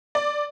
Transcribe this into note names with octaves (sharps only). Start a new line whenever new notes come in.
D5